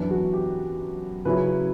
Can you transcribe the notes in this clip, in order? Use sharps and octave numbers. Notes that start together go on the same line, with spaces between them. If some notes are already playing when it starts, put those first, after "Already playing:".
Already playing: F#2 E3 B3 D4
F#4
G4
C#3 F#3 C#4 E4 B4